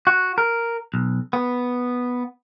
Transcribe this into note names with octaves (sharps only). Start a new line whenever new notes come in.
F#4
A#4
B1
B3